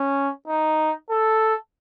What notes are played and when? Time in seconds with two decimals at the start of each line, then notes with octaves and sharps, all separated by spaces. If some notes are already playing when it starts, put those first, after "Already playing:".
Already playing: C#4
0.48 D#4
1.10 A4